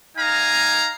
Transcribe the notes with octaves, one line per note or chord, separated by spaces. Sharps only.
D#4 F5 G#5 A#5